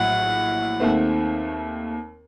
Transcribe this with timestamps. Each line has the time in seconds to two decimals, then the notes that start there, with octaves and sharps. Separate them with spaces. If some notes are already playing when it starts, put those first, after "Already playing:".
Already playing: A#1 A2 F#3 F#5
0.80 D#2 D#3 A3 C4